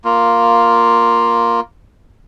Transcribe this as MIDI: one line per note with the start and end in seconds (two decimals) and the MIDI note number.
0.05 1.60 58
0.05 1.60 65